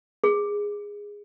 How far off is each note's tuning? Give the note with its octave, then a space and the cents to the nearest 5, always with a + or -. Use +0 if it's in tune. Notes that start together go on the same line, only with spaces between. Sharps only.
G#4 -15